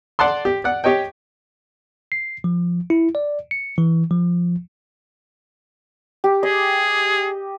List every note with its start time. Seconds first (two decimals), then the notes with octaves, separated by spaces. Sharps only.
0.19 D5 F#5 A5 C6
0.45 G4
0.64 D5 F#5
0.84 G4 C#5 D#5 G5
2.12 C7
2.44 F3
2.90 E4
3.15 D5
3.51 C#7
3.78 E3
4.11 F3
6.24 G4
6.43 G#4 D#5